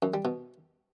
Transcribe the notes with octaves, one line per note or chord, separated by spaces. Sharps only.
F#2
G3
B2